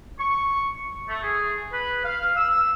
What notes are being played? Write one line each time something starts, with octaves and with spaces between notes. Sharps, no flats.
C#6
A3
G#4
B4
F5
E6